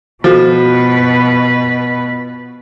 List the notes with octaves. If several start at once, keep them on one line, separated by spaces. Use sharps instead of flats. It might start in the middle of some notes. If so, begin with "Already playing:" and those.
B2 F3 F#4 A4 B4